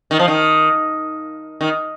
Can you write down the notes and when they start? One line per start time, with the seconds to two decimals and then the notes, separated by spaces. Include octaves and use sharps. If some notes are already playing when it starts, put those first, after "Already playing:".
0.11 D#3
0.19 F3
0.28 D#3
1.61 D#3